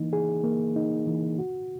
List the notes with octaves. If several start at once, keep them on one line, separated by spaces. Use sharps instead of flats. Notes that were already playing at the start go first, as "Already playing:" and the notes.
Already playing: E3 A#3 D#4
G#4
A#3
D#4
E3
F#4